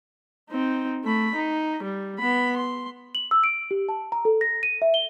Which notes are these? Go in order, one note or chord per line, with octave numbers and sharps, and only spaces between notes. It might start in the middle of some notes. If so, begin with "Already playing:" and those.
C4 D#4
A3 B5
D#4
G3
B3 B5
C6
F#7
E6
D7
G4
A5
A#5
A4
A#6
D#7
E5
G7